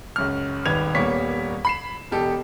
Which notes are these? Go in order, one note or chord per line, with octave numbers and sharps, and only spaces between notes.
C#2 F#2 F6
D#1 G#1 B4 G#6 F7
D#1 G3 A#3 B3 C#5 B6
B5 C7 E7
E1 B2 G4 A4